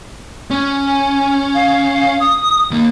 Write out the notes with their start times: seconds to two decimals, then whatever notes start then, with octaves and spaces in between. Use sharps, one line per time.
0.51 C#4
0.87 G#5
1.55 F5
2.20 D#6
2.71 D#2 A#3